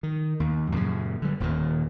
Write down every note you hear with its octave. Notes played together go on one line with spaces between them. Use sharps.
D#3
D#2
F#2 A#2 C#3
D3 G3
D#1 D#2 A#2 D#3